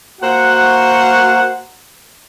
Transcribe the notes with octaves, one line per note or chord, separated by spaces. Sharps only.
A#3 F#4 C5 F#5